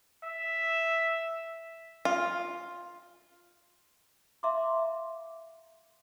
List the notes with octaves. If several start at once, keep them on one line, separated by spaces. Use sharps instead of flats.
E5
F4
E5 F5 A#5 C6 D6